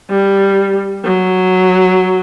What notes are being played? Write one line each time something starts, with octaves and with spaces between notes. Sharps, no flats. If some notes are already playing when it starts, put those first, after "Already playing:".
G3
F#3